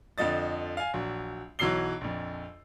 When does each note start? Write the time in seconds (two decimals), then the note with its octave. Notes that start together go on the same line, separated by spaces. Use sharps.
0.18 F2 D3 F3 D#5 A6
0.77 F5 G#5
0.94 A#1 F#3
1.59 B1 E3 F#3 E6 C7 G7
2.01 A#1 F2